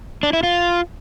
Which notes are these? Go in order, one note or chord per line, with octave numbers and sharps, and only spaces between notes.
D4
E4
F4